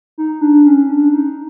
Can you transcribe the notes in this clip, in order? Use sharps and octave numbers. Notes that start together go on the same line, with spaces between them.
D#4
D4
C#4
D4
D#4